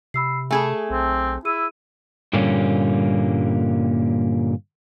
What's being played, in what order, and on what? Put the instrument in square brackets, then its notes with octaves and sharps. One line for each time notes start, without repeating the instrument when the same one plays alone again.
[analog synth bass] C3 [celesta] B5 E6 C7
[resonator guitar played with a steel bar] A3 G#4 A4 [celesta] G#5 G#6
[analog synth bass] B1 [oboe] C4
[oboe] E4 [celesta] G#4 E6 D#7
[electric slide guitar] G2 A#2 D3 G3 A#3 C#4